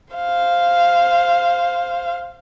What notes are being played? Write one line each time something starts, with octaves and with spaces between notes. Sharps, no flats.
C5 F5